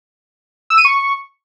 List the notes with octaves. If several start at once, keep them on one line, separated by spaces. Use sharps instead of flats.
E6
D#7
C#6